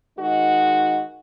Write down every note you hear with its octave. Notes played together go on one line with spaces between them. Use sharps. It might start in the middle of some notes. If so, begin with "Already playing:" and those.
D#3 G#3 D#4 F#4